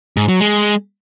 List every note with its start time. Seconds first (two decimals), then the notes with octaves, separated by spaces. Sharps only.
0.17 G#2
0.29 F#3
0.40 G#3